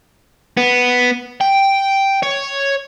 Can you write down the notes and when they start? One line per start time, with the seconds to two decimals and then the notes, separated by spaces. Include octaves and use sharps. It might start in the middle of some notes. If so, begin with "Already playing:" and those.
0.57 B3
1.41 G5
2.23 C#5